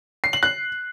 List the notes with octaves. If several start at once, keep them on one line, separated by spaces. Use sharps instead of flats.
C7
F#7
F#6